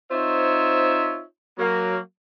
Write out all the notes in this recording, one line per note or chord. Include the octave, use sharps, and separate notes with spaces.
C4 D#4 F4 C5 C#5 E5
F#3 A#3